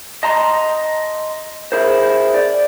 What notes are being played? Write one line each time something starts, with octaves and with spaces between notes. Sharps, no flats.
D#5 A5 A#5 C6
E4 G#4 A#4 C5
D5